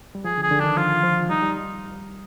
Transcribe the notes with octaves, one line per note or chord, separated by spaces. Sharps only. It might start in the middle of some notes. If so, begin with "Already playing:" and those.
G3
F3 G#4
D3
G#4
D3
D#3 D4
F3 F4
F3
G3 D#4
G3